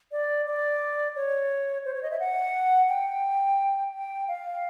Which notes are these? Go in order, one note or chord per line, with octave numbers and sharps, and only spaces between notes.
D5
D5
C#5
C5
C#5
D#5
E5
F#5
G5
G5
F5